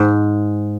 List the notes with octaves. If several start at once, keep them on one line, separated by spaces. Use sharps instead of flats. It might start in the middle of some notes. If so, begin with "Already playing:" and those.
Already playing: G#2